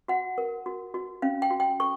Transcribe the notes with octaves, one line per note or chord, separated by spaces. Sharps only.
F#4 F#5
A#4
F#4
F#4
C#4 F5
G5
F#4
G5
A4 C#6